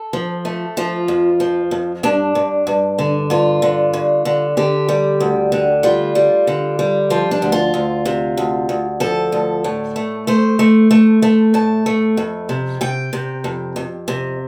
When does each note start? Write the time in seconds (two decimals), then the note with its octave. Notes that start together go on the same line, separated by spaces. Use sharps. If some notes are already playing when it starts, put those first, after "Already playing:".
Already playing: A4
0.13 F3
0.45 A3
0.77 F3 F4
1.08 F2
1.40 F3
1.71 F2
2.03 G2 D4
2.35 G2
2.67 G2
2.99 D3
3.30 G2 F4
3.62 D3
3.93 G2
4.25 D3
4.57 D3 G4
4.89 G3
5.20 D2
5.52 D3
5.83 G3 F4
6.15 G3
6.47 D3
6.79 G3
7.10 F3 F4
7.31 D4
7.42 D2
7.52 F4
7.74 D2
8.05 C3
8.37 D2
8.69 D2
9.00 F3 A4
9.32 D2
9.64 A2
9.96 A3
10.27 A3 C5
10.59 A3
10.91 A3
11.22 A3
11.54 A2 A5
11.86 A3
12.17 F2
12.49 C3
12.81 C3 G5
13.13 C3
13.44 F2
13.76 F2
14.08 C3